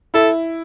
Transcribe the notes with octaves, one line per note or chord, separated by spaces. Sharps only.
E4 A4